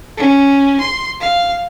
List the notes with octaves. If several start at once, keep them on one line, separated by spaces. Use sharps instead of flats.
C#4
C6
F5